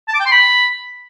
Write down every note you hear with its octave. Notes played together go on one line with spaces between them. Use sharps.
A5
D6
G5
C6
B5